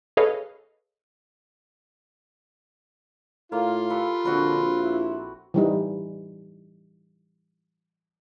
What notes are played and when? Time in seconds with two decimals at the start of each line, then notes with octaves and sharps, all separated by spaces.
0.17 G#4 A4 B4 C#5 D#5 F5
3.52 A2 A#3 F4
3.90 G4 A4 B4
4.25 A#1 D3 C4 F#4 B4
4.80 E4
5.54 E3 G3 D#4